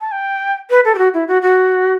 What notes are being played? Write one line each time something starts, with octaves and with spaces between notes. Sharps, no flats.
A5
G5
B4
A4
G4
F#4
E4
F#4
F#4